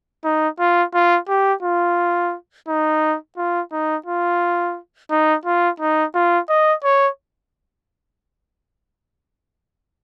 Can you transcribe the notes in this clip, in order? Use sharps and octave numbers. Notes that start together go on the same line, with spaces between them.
D#4
F4
F4
G4
F4
D#4
F4
D#4
F4
D#4
F4
D#4
F4
D#5
C#5